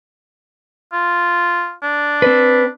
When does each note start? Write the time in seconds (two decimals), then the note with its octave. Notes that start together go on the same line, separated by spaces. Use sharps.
0.93 F4
1.83 D4
2.22 C4 B4